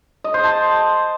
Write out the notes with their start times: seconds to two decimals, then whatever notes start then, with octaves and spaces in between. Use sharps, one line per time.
0.24 D#5
0.34 C5
0.44 A5